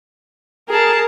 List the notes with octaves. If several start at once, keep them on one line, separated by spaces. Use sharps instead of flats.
G#4 A#4 A5